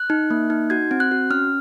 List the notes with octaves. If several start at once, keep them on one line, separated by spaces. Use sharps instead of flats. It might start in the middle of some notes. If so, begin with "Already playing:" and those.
Already playing: F#6
D#4
A#3
D#4
F#4 G#6
C4
F#6
F#4
C#4 F6